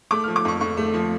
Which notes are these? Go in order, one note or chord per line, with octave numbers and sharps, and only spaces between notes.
A3 D6
F6
F3
D6
F2 C#6
F2 C#6
A3
F3